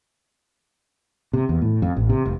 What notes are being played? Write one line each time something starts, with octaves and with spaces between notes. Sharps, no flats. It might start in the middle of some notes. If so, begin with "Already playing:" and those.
C3
E2
A2
F2
A1
C3
F1